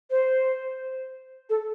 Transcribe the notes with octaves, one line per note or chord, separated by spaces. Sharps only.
C5
A4